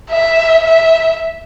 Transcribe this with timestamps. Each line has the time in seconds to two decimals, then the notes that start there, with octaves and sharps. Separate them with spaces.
0.11 E5
0.64 E5